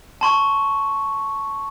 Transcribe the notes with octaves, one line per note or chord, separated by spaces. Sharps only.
A5 C6 C#6